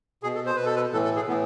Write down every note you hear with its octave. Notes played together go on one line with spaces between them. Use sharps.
B2 G#4
A4
C5
B2 B4
A4
B4
A2 E3 A4
A4
G#4
A2 E3 B3